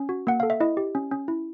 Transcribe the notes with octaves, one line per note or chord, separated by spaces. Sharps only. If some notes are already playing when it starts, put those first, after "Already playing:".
Already playing: C#4
F#4
A#3 F#5
A4 F5
E5
E4 D#5
G4
C#4
C#4
E4